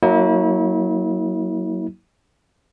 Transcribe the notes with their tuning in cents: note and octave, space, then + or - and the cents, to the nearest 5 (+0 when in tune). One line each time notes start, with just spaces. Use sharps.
F#3 +0 A#3 +0 E4 -40